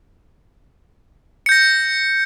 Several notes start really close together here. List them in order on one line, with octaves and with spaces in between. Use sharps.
C#7 G6 A#6